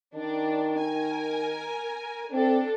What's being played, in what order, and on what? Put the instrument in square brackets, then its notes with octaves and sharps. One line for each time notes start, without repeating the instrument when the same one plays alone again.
[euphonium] D#3 [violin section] D4
[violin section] A#4 G#5
[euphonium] C4 [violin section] D4 A4